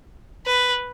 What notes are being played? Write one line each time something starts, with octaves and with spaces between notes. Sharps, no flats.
B4